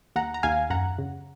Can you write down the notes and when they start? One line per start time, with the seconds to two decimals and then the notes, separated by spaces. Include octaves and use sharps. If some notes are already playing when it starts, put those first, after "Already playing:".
0.16 D#2 F#5 A#5
0.34 A#5
0.43 D#2 F5 G#5
0.70 F#2 F#5 A#5
0.98 C#3